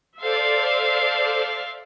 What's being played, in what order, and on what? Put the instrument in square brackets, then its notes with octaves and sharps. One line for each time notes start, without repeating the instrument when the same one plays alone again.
[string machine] A4 C5 D5 [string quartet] E5 F5 C6